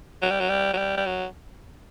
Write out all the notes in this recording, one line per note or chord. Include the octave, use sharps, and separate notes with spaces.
F#3
G3
F#3
G3
F#3
G3
G3
F#3